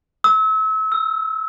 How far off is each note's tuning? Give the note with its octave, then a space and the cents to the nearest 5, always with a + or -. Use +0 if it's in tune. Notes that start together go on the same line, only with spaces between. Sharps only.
E6 -35
E6 +15